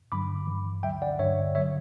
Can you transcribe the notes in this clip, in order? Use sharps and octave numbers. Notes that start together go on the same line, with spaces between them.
G2 D3 F#3 B5 D6
G2 E3
D2 D3 F#3 E5 G5
D5 F#5
G2 D3 F#3 C#5 E5
D3 F#3 C#5 E5